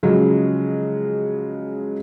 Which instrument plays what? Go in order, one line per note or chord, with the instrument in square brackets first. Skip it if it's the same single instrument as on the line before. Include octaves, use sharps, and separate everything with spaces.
[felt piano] C#3 F3 F#3 G#3